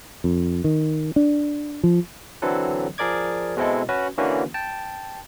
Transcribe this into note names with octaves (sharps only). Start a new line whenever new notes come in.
F2
D#3
D4
F3
D3 E3 F#3 C4 A4 B4
F3 G#4 A#4 D5 D6 G#6
B2 G#3 C4 E4 A4
C#4 F#4 B4
D3 E3 A#3 C#4 F#4 B4
G5 A5